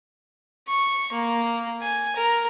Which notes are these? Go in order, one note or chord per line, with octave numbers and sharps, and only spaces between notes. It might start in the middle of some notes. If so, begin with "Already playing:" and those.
C#6
A#3
G#5
A#4